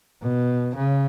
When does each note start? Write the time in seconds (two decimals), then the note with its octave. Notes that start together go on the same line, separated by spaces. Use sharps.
0.23 B2
0.75 C#3